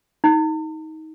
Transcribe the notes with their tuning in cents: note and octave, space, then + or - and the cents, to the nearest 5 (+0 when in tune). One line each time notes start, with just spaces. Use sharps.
D#4 +25